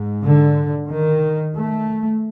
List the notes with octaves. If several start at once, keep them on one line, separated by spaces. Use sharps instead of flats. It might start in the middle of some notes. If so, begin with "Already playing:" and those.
Already playing: G#2
D3
D#3
A3